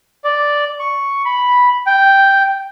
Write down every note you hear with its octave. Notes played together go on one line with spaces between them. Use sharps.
D5
C#6
B5
G5